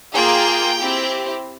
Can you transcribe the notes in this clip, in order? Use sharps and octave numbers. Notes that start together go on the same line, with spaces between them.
A#3 F4 G#4 G5
C4 E4 G4